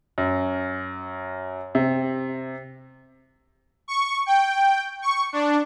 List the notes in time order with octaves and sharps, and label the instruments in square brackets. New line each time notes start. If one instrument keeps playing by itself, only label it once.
[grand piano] F#2
C3
[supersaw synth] C#6
G5
C#6
D4